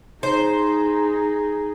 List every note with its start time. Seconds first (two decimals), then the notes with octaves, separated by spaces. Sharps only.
0.23 D#4 G#4 C5